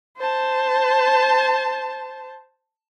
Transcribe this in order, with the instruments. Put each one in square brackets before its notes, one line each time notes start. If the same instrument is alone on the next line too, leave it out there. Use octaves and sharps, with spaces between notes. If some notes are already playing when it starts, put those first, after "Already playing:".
[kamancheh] C5 A5